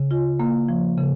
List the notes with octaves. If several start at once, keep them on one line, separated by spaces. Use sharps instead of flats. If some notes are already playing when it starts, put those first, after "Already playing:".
Already playing: C#3
F4
A#3
F3
C#3